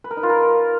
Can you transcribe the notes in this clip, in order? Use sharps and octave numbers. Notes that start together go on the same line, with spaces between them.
B4
A#4
D#4
F4
A#4